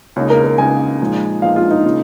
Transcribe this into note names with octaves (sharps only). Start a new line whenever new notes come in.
C#2 C#3 A#3 D#4 C#5
A#4
A#4
C#2 C#3 A#3 D#4 G#5
A#2 F3 G#3 D#4
A#2 F3 G#3 D#4 F5
F4
D#4
C#3 A#3 F4